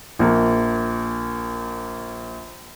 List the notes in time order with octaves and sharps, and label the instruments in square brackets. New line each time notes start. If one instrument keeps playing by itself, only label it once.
[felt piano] A#1 A#3